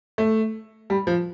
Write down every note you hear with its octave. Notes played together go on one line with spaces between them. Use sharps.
A3
G3
F3